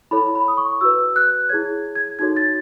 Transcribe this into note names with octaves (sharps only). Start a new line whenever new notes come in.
E4 A4 C#5 B5
B5
D#6
C#6
F#4 B4 E6
F#6
E4 G#4 C#5 G#6
G#6
D#4 F#4 A4 C#5 G#6
A6